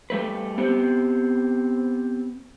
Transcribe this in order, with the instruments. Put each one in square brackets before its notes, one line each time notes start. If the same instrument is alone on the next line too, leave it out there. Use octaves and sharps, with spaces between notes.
[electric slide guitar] G3 A3 B4
B3 C4 G4